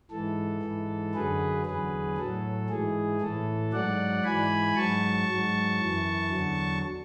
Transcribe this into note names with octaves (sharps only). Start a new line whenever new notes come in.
G#2 E3 A4
G#2 E3
F#2 D3 F#3 G#4 B4
E2 D3 F#3 G#4 B4
A2 F#3 A4
G#2 E3 G#4
A2 E3 A4
G#2 F#3 D5 F#5
G#2 E3 G#5 B5
G#2 F#3 A5 C#6
G#2 F#3
F#2 E3
E2 D3 F#3